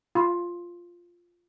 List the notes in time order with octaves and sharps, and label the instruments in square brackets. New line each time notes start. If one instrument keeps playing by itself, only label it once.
[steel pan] F4